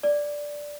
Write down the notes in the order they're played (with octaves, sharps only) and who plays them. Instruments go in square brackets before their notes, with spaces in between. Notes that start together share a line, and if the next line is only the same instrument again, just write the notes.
[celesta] D5